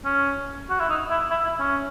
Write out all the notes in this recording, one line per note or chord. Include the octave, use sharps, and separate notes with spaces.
C#4
F#4
E4
D#4
E4
E4
E4
C#4